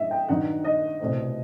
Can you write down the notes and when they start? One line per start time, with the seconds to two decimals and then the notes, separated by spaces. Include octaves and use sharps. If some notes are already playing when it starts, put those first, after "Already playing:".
Already playing: G2 E3 G3 D#5 E5
0.11 G5
0.29 G2 D#3 F#3 B3 D#4 F#5
0.64 D#5
1.00 C2 B2 A3 C4